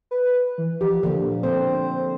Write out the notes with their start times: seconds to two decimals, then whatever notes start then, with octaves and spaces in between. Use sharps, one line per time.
0.11 B4
0.58 E3
0.81 F3 G4
1.03 D3 A#3
1.21 A#2
1.43 C4 C5